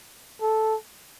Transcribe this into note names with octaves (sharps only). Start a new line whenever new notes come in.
A4